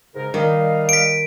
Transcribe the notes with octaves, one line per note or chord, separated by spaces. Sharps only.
G#2 C#3 A#4
D#3 G3 D#5 F5
B6 D7